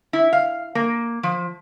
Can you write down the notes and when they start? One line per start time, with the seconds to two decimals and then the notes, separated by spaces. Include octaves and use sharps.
0.13 E4
0.33 F5
0.75 A#3
1.23 F3